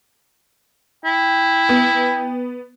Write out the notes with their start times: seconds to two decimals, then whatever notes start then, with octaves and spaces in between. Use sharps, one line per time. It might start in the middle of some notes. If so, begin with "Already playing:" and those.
1.05 E4 G5
1.69 B3